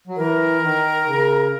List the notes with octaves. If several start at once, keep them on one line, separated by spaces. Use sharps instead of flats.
F#3
E3 A#4
D#3
C#3